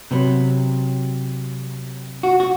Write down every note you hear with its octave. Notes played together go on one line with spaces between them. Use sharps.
C3 F#3 B3
F#4
F#4